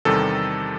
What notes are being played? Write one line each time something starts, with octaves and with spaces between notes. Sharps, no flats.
E2 C3 D#3 G3 A4